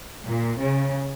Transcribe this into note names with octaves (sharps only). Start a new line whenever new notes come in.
A#2
C#3